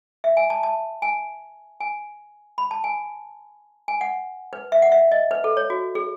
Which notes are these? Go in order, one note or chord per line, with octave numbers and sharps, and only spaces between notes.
E5
G#5
A5
A5
G#5
G#5
B5
A5
G#5
G#5
F#5
B4
E5
F#5
E5
D#5
B4
A4
C#5
F#4
G#4